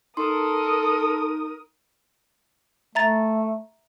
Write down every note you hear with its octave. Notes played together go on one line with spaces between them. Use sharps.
D#4 A4 A#4 C6 D#6
A3 E5 A#5 A6